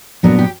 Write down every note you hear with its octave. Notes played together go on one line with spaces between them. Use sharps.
A#2 F#3 B3 D4 A#4
G4